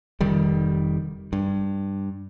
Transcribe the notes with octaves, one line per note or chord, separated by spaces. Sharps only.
F1 D#3 G3
G2